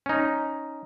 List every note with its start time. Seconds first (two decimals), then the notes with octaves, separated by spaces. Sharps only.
0.06 C#4 D#4